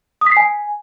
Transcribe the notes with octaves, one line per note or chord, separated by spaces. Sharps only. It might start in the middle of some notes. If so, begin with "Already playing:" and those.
D#6
B6
C7
G#5